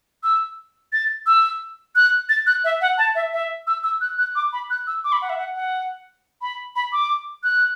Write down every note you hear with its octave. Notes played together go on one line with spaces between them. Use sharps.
E6
A6
E6
F#6
A6
F#6
E5
F#5
A5
E5
E5
E6
E6
F#6
F#6
D6
B5
F#6
E6
D6
B5
F#5
E5
F#5
F#5
B5
B5
D6
F#6